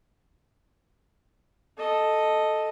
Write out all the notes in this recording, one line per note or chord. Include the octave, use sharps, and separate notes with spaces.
A4 D#5